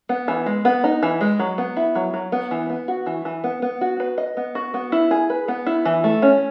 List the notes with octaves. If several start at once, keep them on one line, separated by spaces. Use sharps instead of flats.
B3
E3
G#3
B3
D#4
E3
G#3
F#3
B3
E4
F#3
F#3
B3
E3
B3
F#4
E3
E3
B3
B3
F#4
B4
D#5
B3
F#4
B3
E4
G#4
B4
B3
E4
E3
A3
C#4